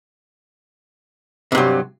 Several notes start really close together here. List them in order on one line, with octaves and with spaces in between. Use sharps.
C3 G2 F#3